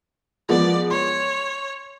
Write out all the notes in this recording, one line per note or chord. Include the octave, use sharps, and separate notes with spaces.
F3 G#3 B3 D5
C#5 C6